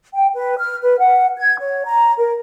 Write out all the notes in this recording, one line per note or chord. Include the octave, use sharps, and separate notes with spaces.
G5
B4
F6
B4
F#5
G#6
C#5
A#5
A#4